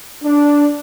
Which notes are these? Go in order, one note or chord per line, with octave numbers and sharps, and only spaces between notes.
D4